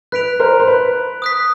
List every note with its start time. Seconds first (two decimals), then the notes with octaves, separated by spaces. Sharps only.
0.12 B4 F#6 B6 D7 F7
0.39 A#4 C5
0.60 C5
0.68 B4
1.22 D#6 F#6 B6